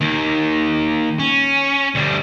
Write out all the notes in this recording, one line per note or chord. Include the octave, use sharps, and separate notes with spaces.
D#2 D#3
C#4
D2 G3